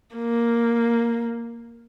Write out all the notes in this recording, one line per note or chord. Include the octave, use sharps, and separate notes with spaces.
A#3